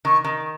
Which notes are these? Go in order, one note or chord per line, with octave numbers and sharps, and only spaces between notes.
D#3 C#6
D#3